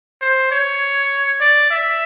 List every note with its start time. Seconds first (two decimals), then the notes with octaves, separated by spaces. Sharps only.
0.21 C5
0.51 C#5
1.41 D5
1.71 E5